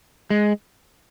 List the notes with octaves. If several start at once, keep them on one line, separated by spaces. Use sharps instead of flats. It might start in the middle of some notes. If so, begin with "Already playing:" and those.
G#3